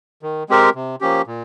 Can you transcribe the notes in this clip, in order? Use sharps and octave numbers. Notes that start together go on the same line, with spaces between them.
D#3
G#3 C4 G4 A#4
C3
F3 A#3 C#4 G4
A#2